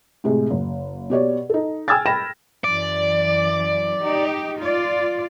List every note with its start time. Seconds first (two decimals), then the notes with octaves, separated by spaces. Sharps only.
0.24 A2 C3 G#3
0.50 F#1
1.10 B2 G4 C#5 D5
1.49 D#4 A4
1.88 G5 G#5 E6 F6 G#6 A6
2.06 G5 B5 A#6 E7
2.64 F#2 E3 D5
4.02 D#4 G4
4.59 F4 D5